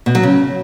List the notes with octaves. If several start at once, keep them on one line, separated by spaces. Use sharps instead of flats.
B2
F#3
C#3